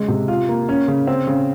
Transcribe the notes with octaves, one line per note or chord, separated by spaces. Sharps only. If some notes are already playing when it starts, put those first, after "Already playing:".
Already playing: C#3 G#3
C3
F4
A#3
C#4
C#3
C4
C#3